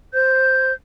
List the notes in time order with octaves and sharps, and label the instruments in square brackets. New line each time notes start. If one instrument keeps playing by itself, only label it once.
[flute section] C5 G6